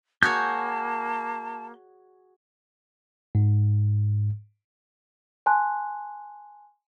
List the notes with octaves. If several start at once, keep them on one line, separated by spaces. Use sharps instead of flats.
A#3 F#4 G#4 C#5 A5 G6
G#2
G#5 A5 C6 F#6